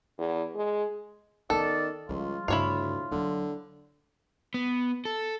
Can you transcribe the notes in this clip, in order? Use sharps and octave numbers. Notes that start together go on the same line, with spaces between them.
E2
G#3
D#3 B3 C#4 A4 D5
C#2 F3 G3 F4
D2 G2 C#3 E4 C#5 F5
E2 D3 F#3
B3
A4